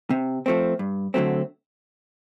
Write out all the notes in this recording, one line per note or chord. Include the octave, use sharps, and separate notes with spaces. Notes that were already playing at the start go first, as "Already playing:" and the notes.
C3
F3 A3 C4
G2
D3 F#3 A3 C4